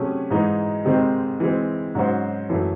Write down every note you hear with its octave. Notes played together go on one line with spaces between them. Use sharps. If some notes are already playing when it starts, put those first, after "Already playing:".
Already playing: C3 F#3 A3 C#4 G#4
G#2 E3 G#3 D#4
C3 D#3 G#3 C4
E3 G#3 C4
G#2 F#3 C#4 F#4 C5
F#2 E3 A3